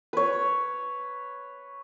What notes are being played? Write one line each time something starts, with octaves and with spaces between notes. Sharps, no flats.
B4 C#5